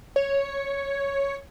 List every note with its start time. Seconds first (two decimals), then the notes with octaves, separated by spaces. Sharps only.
0.16 C#5